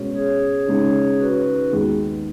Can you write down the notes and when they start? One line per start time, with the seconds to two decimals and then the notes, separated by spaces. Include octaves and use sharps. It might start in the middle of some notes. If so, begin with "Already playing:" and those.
Already playing: B2 G#3 C#4
0.16 G#4 C#5
0.68 C#3 G#3 D#4
1.19 F#4 B4
1.71 D#2 D#3 G#3 B3